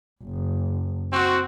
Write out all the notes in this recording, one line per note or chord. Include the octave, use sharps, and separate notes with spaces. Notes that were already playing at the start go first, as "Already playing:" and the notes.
F#1
C4 F#4